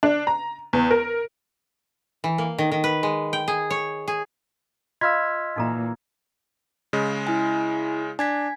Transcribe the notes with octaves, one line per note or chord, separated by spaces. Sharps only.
D4
A#5
E2
A#4
E3
A#3
D#3
D#3
B4
G#3
G5
G#4
C#5
G#4
F4 D#5 F5 C6 E6 F6 G#6 B6
A#2 E3 D#4 A4 A#5
C#3 G#3
E4 G#5
D4 G#5 G#6 B6